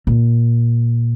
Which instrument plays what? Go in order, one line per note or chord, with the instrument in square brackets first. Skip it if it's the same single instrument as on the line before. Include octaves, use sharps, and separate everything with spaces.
[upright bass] A#2